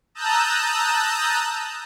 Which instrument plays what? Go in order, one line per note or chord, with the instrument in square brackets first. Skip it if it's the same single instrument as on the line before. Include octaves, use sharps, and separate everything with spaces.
[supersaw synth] A5 A#5 D#6 E6 F#6 G6